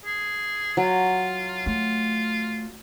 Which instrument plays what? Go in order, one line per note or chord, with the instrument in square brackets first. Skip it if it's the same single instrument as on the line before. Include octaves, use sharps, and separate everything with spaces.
[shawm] G#4
[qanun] F#3 [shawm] F4
[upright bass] A3 [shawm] F4